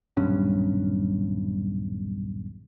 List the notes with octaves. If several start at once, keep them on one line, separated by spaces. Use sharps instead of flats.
D#1 B1 G2 C#4